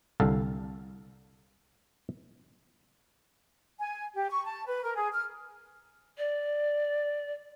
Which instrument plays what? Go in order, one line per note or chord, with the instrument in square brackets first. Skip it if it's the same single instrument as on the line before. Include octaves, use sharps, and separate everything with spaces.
[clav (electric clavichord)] C2 D3 A4 F5
[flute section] G#5
G4
C#6
A5
B4
A#4
G#4
F6
[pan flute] D5